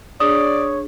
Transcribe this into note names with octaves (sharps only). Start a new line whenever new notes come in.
D4 G#4 C#5 D5 D#6